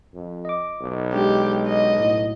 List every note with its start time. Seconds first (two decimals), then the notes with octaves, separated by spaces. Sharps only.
0.14 F2
0.45 D#5 D6
0.81 B1
1.13 G#3 D4 G4
1.68 D#5
2.00 A2